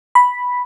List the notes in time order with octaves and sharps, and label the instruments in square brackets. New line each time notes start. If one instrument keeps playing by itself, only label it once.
[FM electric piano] B5